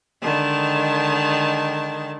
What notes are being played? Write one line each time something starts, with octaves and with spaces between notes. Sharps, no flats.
D3 D#3 G#3 A5